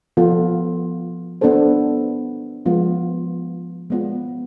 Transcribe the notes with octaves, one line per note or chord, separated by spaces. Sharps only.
F3 B3 F4 A4
B3 D4 A4 C5
F3 G#3 B3 F4
G#3 B3 F4